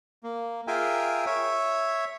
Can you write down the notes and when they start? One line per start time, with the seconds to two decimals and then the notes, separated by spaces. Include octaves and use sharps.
0.23 A#3
0.67 F4 G#4 A#4 E5 G5 G#5
1.26 C#5 E5